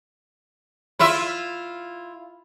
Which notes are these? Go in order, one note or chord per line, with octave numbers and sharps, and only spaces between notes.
E4 F4 E5